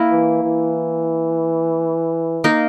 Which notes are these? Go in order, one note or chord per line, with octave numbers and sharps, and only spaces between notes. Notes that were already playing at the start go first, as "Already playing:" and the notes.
Already playing: A#3 E4 A#4
E3
E3
A#3 D#4 A#4